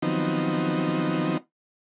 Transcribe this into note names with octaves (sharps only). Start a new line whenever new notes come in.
D#3 F3 F#3 B3 C4 D#4